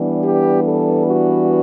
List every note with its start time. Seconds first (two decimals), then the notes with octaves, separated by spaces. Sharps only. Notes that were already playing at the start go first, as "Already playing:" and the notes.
Already playing: E3 G3 B3 D4
0.22 G4
0.63 A4
1.06 F#4